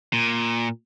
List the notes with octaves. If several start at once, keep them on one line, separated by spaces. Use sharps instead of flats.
A#2